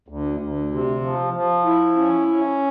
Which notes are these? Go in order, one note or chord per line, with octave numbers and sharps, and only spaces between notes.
D2
D2
C3
F3
F3
E4
C#4
C#4